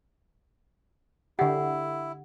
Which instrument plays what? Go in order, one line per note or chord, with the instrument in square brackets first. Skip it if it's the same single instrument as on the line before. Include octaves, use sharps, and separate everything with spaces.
[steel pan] D3 G4 [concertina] E4 [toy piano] F#5